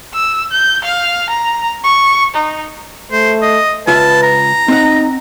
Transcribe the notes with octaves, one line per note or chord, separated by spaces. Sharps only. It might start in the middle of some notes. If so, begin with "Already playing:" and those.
E6
G6
F5
A#5
C#6
D#4
A3 C5
D#5
C#2 F4 B4 E5 A5
A#5
C4 D#4 F#5